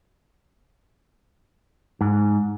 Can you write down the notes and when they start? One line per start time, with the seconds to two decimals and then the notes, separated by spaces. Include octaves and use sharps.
2.01 G#2